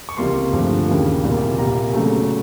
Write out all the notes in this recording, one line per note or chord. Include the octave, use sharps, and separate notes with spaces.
C#6
C#2 C3 E3 G3 A#3 C6
G2 D3 F3 A3
D#2 C#3 E3 G3 A#3
C2 A#2 G3 A#3
C2 A#2 G3 A#3 A#5
E2 C#3 F#3 A3